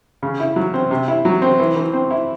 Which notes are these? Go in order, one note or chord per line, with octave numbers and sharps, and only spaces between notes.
C#3
E4
F#3
C4
C3
E4
F#3
C4
E3
E3
C4
E4